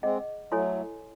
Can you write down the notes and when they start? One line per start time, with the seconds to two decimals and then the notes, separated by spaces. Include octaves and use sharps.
0.03 G#3 C4 G#4 D#5 F#5
0.52 F#3 A3 E4 A4 C#5 G#5 C6